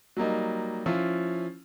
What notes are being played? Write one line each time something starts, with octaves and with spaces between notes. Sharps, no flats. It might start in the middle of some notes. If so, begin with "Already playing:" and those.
F#3 G3 A#3 D#4
F3 C#4 E4 F4